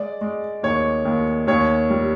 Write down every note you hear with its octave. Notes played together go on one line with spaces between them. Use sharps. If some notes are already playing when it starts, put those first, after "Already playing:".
Already playing: G#3 D5
G#3
D#2 C#5
D#2
D#2 C#5
G3